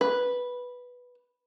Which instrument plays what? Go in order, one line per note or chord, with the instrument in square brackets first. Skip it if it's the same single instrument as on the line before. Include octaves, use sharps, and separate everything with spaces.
[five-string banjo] B4